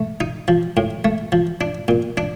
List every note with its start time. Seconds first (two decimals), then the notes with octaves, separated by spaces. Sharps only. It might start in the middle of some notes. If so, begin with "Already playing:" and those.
Already playing: A3
0.21 D#4
0.48 F3
0.77 A2
1.05 A3
1.32 F3
1.61 D4
1.88 A#2
2.17 D4